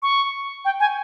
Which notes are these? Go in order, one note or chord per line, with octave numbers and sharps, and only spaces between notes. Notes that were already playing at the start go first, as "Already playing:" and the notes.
C#6
G5
G#5